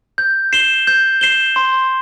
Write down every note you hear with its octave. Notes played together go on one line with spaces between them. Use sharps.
G6
C7 E7 G7
G6
C7 E7 G7
C6